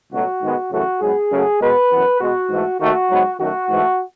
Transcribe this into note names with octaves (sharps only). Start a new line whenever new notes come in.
C#2 B2 F#3 A3 F#4
G#2 D#3 G#3 B3
F#2 C#3 E3 A3 F#4
G#2 F#3 B3 G#4
F#2 C#3 F#3 A3
B2 G#3 B3 B4
F#2 E3 B3
B2 G#3 B3 F#4
G#2 E3 A3
D#2 D#3 A3 F#4
G#2 F#3 B3
F#2 D#3 A3 F#4
G#2 E3 A3